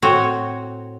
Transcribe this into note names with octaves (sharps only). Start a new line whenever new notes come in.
A2 C4 F#4 C#5